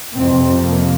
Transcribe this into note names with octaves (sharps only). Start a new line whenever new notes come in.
F2 C3 C4
A#3